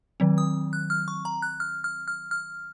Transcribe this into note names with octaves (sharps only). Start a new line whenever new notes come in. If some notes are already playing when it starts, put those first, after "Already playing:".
D#3 F#3 C4
D#6
F#6
F6
C#6
A#5
F#6
F6
F6
F6
F6